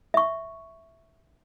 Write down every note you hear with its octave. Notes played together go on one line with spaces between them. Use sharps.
E5 C#6